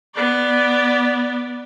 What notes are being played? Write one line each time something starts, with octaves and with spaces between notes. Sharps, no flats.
B3 D5